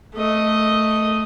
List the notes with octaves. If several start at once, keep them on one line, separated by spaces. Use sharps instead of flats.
A3 D#5